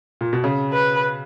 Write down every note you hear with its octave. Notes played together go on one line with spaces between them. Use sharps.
A#2
B2
C#3
B4